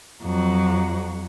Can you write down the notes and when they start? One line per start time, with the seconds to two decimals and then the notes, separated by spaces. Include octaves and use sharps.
0.23 F2 F#3